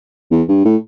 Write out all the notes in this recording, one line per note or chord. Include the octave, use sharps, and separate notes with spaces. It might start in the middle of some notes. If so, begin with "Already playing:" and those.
E2
G2
A2